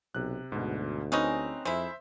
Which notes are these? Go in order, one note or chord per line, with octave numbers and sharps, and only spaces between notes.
B1 C3 F#6
D2 G#2 B2
G#3 C4 C#4 D#4 B4
F2 G#3 E4 C5 E5